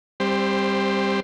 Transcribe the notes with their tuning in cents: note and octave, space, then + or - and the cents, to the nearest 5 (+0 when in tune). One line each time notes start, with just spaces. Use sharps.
G3 +15 C4 +25 C5 -5